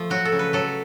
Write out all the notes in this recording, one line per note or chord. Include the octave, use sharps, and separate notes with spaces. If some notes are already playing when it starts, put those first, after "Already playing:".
Already playing: F3 A3
F#3 F#4
A4
C#3
B4
F#3 A4